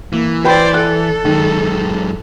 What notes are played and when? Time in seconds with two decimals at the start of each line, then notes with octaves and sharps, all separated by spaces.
0.13 E3 A#3
0.44 B4 C5 D5 G5 B5
0.74 A4 F#6
1.25 F#2 D#3 G#3